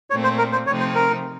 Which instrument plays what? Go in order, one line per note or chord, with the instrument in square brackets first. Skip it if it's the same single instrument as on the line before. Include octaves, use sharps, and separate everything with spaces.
[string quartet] A#2 A3 C4 [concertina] C#5
[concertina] C5
A#4
C5
[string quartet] C3 F3 A3 C4 D#4 [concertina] C#5
[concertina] C5
A#4